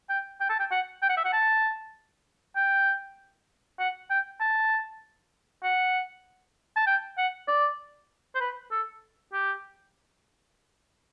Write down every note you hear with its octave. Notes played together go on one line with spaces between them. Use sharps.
G5
G5
A5
G5
F#5
G5
F#5
E5
F#5
A5
G5
F#5
G5
A5
F#5
A5
G5
F#5
D5
C5
B4
A4
G4